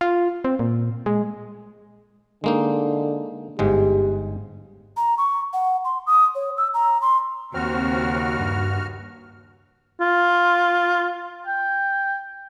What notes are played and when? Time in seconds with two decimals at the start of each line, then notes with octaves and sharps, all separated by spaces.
0.01 F4
0.45 C4
0.59 A#2
1.06 G#3
2.44 D3 G#3 A#3 D#4
3.59 G1 G#2 G#3 G4
4.97 A#5
5.18 C#6
5.53 F#5
5.85 C6
6.07 D#6
6.35 C#5
6.57 E6
6.74 A#5
7.02 C6
7.54 D#2 C#3 C4 F#4 F6
8.39 G2
10.00 F4
11.46 G5